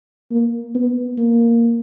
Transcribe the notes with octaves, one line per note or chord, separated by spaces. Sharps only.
A#3
B3
A#3